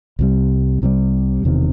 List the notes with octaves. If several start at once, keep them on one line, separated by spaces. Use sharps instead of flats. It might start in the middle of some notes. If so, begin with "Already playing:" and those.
C2 C3 E3 G3
C2 C3 E3 G3
E1 E2 C3 D#3